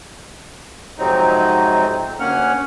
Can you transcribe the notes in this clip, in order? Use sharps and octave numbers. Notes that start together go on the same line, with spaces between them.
F2 G#2 C3 F#3 C4 D#4
D2 A#3 C#4 F#5 F6